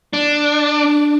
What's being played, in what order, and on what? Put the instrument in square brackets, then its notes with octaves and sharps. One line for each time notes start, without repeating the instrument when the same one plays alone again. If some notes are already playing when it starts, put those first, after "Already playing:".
[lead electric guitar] D4
[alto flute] D4